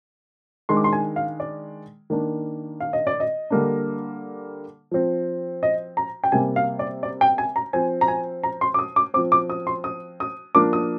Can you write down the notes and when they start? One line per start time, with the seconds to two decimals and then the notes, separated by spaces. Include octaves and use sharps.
0.69 D#3 G#3 D4 C6
0.77 D6
0.84 C6
0.93 G#5
1.16 F5
1.40 D5
2.10 D#3 A#3 D4
2.80 F5
2.93 D#5
3.07 D5
3.20 D#5
3.50 D3 G3 A#3 D4
4.91 F3 C4
5.63 D#5
5.97 A#5
6.24 G5
6.32 C3 G3 A#3 G#5
6.56 F5
6.79 D5
7.03 D5
7.21 G5
7.38 G#5
7.56 A#5
7.73 F3 C4 G#5
8.01 A#5
8.08 G#5
8.43 A#5
8.61 C6
8.74 D6
8.79 D#6
8.96 D6
9.14 C4 D6
9.17 F3
9.32 D6
9.49 D#6
9.67 C6
9.84 D#6
10.20 D#6
10.55 F3 A#3 D4 D6
10.73 D#6